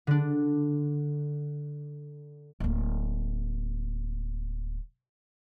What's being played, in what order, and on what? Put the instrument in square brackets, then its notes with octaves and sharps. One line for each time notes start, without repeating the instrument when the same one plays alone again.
[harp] D3 D4
[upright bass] D1 A#3